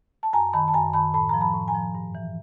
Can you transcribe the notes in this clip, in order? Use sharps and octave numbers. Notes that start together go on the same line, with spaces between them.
A5
F#2 G#5 A#5
D#3 A5 B5
A5
F#2 G#5 A#5
D#3 A5 B5
A2 A5 B5
F3 A#5
A5 B5
A2
G#5 A#5
F3
G2
E3